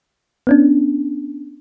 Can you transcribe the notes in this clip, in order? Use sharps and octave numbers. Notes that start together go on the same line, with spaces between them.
B3 C#4 D4